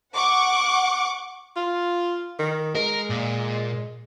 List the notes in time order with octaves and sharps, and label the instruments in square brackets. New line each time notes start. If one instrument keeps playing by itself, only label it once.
[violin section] F#5 C#6 D6
[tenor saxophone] F4
D#3
[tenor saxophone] G#3 [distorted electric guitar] A#4
[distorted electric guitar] A#2